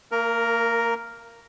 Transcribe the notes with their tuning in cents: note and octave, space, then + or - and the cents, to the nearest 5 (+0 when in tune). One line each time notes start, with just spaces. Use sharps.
A#3 -30 A#4 +0 A#5 +0